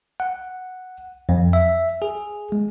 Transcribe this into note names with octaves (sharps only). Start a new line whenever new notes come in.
F#5
F2
E5
G#4
G#3